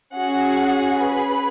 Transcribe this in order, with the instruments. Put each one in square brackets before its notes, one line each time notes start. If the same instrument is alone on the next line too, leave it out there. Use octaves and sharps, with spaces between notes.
[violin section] C#4 F#4 G#4 F#5
B4 B5